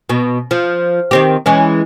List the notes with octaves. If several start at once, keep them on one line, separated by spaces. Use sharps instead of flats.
B2
F3
D#3 C4 G4
E3 G#3 C#4